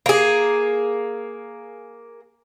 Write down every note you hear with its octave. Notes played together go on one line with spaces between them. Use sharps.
A#3 G#4